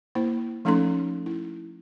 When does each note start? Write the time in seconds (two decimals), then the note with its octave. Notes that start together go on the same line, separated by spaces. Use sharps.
0.15 A#3 E4 C5
0.65 F3 A3 C#4 D#4 A4 C6
1.26 E4